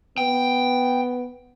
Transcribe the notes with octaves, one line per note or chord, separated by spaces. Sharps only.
B3 G5